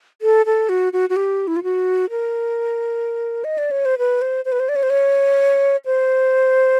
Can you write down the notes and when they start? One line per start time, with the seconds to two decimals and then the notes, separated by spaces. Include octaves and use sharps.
0.22 A4
0.46 A4
0.69 F#4
0.93 F#4
1.10 F#4
1.16 G4
1.47 E4
1.56 F4
1.63 F#4
2.10 A#4
3.44 D#5
3.58 D5
3.71 C#5
3.85 C5
3.98 B4
4.22 C5
4.45 C5
4.52 B4
4.60 C5
4.69 D5
4.76 C#5
4.83 C5
4.90 C#5
5.86 C5